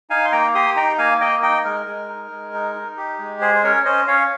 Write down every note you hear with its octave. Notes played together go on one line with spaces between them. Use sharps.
D#4 F5 G#5
C6
A#3 G5 A#5
G4 C6 D#6
D#4 G5 A#5
A#3 F5 G#5
A#3 D#5 G5
D#4 D#5 G5
G#3 A#4
G#3
D#4
G#3
D#4
D#4
G4
G#3
G#4 C5
C5
C#4 A#4 C#5
C#4 C5 D#5
C#4 C#5 F5